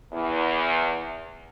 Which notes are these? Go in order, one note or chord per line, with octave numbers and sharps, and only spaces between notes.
E2